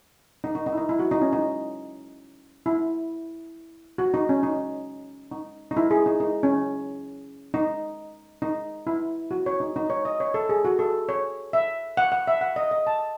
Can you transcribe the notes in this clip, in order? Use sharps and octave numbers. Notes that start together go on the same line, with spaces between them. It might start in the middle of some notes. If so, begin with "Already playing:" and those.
D#4
D#4
D#4
E4
D#4
E4
F#4
D#4
C#4
D#4
E4
F#4
D#4
C#4
D#4
D#4
D#4
E4
G#4
D#4
D#4
C#4
D#4
D#4
E4
F#4
C#5
D#4
D#4
C#5
D#5
C#5
A4
G#4
F#4
A4
C#5
E5
F#5
F#5
E5
F#5
D#5
D#5
A5